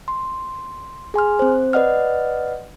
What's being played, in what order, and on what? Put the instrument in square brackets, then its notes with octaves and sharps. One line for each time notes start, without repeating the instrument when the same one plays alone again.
[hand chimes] C6
G#4 G#5 C6 F6
C4 C5
B4 D5 D#5 F#5 F6